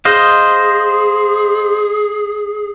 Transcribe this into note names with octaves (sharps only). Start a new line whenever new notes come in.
G#4 C5 D#5 F5